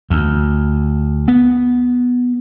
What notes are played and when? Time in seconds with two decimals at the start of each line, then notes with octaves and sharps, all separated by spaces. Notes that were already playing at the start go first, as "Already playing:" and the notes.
0.10 D2
1.28 B3